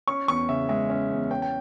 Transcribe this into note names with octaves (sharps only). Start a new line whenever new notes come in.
C#4 C#6
E2 C#6
C#3 E5
G#3 E5
C#4
E2
C#4 G5
G5